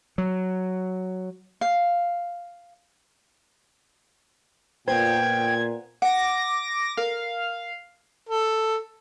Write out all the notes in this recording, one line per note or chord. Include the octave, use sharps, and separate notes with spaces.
F#3
F5
A#2 B3 C5 G5 G#6
F#5 D6 A#6
A#4 F5
A4